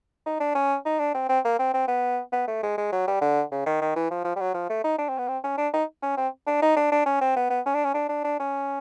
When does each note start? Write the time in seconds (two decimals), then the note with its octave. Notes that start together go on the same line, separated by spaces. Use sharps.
0.26 D#4
0.40 D4
0.55 C#4
0.86 D#4
0.99 D4
1.15 C4
1.29 C4
1.45 A#3
1.59 C4
1.74 C4
1.88 B3
2.32 B3
2.47 A3
2.63 G#3
2.77 G#3
2.92 F#3
3.07 G3
3.21 D3
3.51 C#3
3.66 D#3
3.81 D#3
3.96 E3
4.11 F3
4.24 F3
4.36 G3
4.40 F#3
4.54 F3
4.69 A3
4.84 D#4
4.98 D4
5.09 C4
5.18 B3
5.28 C4
5.44 C#4
5.58 D4
5.73 D#4
6.02 C#4
6.17 C4
6.47 D4
6.62 D#4
6.76 D4
6.92 D4
7.06 C#4
7.21 C4
7.36 B3
7.50 B3
7.66 C#4
7.74 D4
7.85 C#4
7.94 D4
8.09 D4
8.24 D4
8.40 C#4